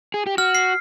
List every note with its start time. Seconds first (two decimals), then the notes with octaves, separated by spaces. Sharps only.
0.14 G#4
0.27 G4
0.38 F#4 F6
0.55 C7